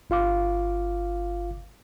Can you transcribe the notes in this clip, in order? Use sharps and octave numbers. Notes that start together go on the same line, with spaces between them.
G1 F4 F5 D6